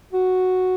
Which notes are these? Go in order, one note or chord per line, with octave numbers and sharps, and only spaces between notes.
F#4